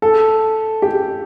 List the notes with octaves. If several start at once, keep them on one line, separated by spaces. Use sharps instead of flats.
A4
G4